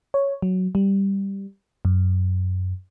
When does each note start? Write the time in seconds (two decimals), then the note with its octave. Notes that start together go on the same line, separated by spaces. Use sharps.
0.14 C#5
0.42 F#3
0.75 G3
1.85 F#2